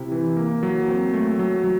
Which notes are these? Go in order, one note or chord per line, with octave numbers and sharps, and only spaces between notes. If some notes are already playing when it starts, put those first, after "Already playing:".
Already playing: C3 E4
E3
A#3
F#3
C4
A3
F#3
F#3